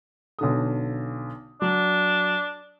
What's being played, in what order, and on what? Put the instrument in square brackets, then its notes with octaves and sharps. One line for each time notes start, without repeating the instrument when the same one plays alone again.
[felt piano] B1 D3 D#6
[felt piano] F#3 [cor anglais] D4